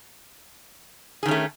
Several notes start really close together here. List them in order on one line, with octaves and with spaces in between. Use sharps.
G#4 D#3 C#4 A3